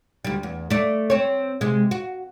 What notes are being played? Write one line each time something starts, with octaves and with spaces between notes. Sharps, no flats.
D2 G3
E2
A3 D5
C4 C#5
C3 G#3
F#4